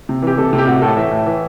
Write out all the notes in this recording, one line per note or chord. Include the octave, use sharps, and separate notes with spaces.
C3
E3 G4
C3 A4
C3
G4
A2 F#4
A2 A4
E3 E5
A2
E3